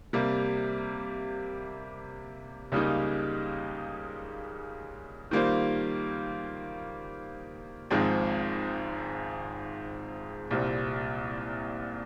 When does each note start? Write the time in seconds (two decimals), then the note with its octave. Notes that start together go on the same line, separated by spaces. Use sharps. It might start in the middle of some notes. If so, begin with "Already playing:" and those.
0.13 C3 G3 A#3
2.72 C#2 C#3 G3 A#3 D#4
5.31 D#3 G3 A#3 F4 C5
7.91 G#1 G#2 F3 G#3 C4
10.51 C2 A#2 G3 C4